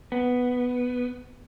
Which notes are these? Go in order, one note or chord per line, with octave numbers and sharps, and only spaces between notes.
B3